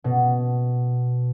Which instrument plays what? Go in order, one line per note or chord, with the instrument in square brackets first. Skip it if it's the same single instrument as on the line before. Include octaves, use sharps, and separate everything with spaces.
[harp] B2